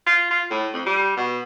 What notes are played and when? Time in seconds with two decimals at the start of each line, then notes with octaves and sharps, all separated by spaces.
0.06 F4
0.31 F4
0.51 A2
0.74 F2
0.86 G3
1.17 B2